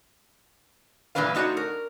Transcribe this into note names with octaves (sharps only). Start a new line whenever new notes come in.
A#2 E3 G3 D4 B4 F5
A3 D#4 F#4 C5 C#5
A#4